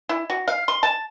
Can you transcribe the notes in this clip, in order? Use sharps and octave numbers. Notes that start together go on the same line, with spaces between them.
E4
F#4
F5
C6
A5